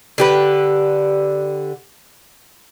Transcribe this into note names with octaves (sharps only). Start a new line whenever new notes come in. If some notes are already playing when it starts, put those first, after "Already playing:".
D3 G4 B4